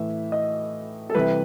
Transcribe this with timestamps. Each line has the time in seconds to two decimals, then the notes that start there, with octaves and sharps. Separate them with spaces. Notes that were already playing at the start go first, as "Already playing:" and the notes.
Already playing: A2 E3 A3 E5
0.32 D#5
1.10 A4
1.15 C3 E3 G3 B4